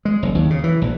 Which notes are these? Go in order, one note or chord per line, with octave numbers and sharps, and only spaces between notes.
G#3
F#1
D#2
C#3
E3
A#1